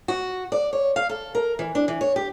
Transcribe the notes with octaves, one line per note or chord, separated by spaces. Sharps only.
F#4
D5
C#5
F5
A4
A#4
E3
D4
E3
C#5
G4